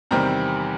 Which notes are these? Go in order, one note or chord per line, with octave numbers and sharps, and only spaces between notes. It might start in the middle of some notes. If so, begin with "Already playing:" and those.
E2 C3 D#3 G3 C4 A#5